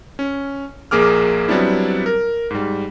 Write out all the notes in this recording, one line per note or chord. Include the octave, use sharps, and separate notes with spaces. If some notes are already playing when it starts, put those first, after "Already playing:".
C#4
A#1 A#3 G#4 D6 F6
F#3 G3 B3 C4 D4 E4
A#4
G#2 G3